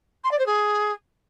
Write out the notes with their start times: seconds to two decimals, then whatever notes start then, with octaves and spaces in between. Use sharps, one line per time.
0.24 C6
0.31 D5
0.39 C5
0.46 G#4